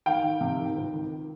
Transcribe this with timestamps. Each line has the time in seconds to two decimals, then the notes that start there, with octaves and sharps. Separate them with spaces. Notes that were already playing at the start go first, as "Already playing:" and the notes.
0.06 D#3 F5 G5
0.23 D#3
0.41 C3
0.59 D#3
0.76 C#2
0.94 D#3